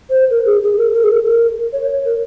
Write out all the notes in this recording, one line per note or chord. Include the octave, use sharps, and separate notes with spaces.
C5
A#4
G#4
G#4
A#4
A#4
G#4
A#4
A#4
C#5
A#4